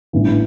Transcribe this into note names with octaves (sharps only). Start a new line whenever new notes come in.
A1 G2 E3